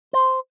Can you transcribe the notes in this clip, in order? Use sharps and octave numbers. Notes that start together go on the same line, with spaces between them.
C5